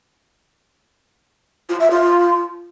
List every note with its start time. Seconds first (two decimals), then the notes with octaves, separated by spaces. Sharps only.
1.69 F4
1.80 E5
1.91 F4